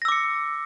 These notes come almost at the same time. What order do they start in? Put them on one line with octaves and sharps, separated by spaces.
A#6 E6 D6 C#7